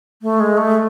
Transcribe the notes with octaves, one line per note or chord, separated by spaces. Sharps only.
A3
G#3
A3